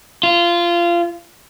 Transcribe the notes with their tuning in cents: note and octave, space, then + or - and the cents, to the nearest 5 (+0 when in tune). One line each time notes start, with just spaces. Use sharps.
F4 -20